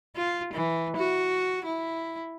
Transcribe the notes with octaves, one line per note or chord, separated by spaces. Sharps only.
F4
E3
F#4
E4